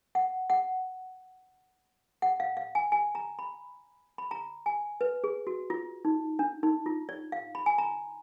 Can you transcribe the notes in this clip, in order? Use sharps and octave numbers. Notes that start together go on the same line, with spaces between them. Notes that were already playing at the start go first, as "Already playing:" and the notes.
F#5
F#5
F#5
F5
F5
G#5
G#5
A#5
B5
B5
A#5
G#5
B4
G#4
F#4
F4
D#4
D4
D#4
F4
D5
F5
B5
G#5
A#5